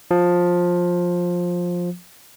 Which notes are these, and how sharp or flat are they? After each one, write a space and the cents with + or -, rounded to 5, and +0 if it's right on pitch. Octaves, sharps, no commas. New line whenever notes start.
F3 +15